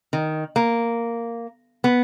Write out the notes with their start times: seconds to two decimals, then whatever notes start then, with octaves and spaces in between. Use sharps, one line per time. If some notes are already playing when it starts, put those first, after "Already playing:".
0.13 D#3
0.56 A#3
1.84 B3